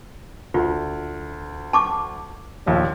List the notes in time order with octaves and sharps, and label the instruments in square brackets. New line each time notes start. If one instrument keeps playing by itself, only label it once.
[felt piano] D2 [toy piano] F4
[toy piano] A5 C#6 D6
[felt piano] A#1 D#2 A#2